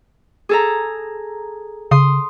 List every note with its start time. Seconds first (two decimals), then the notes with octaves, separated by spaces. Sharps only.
0.49 G#4 A4 A#5
1.91 C#3 C6 D#6